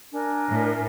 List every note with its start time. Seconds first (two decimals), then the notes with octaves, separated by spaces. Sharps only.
0.11 D4 A#4 G#5
0.50 A2